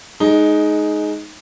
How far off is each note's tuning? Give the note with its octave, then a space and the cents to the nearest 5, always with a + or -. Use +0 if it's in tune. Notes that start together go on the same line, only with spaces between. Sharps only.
G#3 +20 D#4 +0